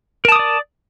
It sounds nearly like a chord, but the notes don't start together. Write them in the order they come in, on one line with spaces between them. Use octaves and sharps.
A#4 A5 D#6 D6 D5